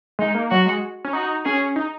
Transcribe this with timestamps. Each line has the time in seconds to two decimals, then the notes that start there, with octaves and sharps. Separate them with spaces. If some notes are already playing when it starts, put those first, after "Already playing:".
0.19 G#3 D#4
0.34 A#3
0.50 F#3 F#4
0.66 G#3
1.05 C#4
1.13 D#4 F#4
1.45 C#4 G#4
1.76 D#4